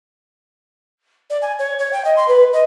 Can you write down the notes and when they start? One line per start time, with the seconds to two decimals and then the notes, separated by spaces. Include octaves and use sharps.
1.29 D5
1.41 G#5
1.58 C#5
1.78 C#5
1.92 G5
2.04 D#5
2.16 C6
2.27 B4
2.52 D#5